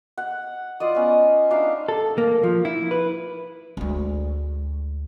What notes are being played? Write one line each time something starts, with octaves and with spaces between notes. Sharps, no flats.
F#5
F4 D5 D#5
B3 C#4
D4 D#4 E5 F5
A4
A#3
F3
E4
B4
D2 G#3